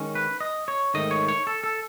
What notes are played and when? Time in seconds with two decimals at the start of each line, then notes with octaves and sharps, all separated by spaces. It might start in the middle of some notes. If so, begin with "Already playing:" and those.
Already playing: D#3 G#3 C#4
0.15 B4
0.40 D#5
0.68 C#5
0.94 G#2 D#3 A3 D#4 D#5
1.11 C#5
1.28 C#5
1.47 A4
1.64 A4